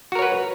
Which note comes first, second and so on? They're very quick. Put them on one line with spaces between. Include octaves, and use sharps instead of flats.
F#4 A#4 C#5 B4